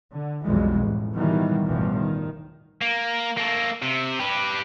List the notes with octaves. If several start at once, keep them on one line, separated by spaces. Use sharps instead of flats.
D3
B1 F2 B2 E3 G3 G#3
A1
B2 D#3 E3 F#3 G3
A1 E2 G2 B2 E3 F3
D#3
A#3
A#3 A4
C3
G4 B4